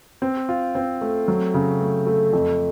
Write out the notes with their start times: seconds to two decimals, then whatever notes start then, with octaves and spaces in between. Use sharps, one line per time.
0.22 C4
0.49 F4
0.75 C4
1.01 A3
1.28 F#3
1.54 C#3
1.80 A3
2.07 A3
2.33 F2